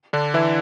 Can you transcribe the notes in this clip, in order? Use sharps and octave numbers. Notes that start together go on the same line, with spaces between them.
D3 D4
E3 E4